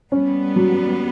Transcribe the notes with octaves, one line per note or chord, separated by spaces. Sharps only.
G3 B3 C#4
F#3